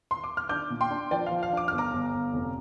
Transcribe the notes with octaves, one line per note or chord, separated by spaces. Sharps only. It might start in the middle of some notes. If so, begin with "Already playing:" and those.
C6
D6
F6
D4 D6 G6
A#2
G5 C6
D4
F3 D5 G5
F5
F3
F5
D4 D6
G1 F6
A#5 D6
G1
G1
F1